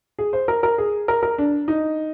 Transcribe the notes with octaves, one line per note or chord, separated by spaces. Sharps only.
G#4
C5
A#4
A#4
G#4
A#4
A#4
D4
D#4